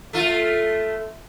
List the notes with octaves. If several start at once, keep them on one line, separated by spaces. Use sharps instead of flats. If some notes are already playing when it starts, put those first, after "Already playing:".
A3 F4